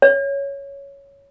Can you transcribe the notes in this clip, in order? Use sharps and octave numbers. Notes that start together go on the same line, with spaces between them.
C#5